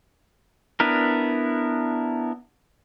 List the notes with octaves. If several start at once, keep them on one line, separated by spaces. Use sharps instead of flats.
B3 D4 E4 A#4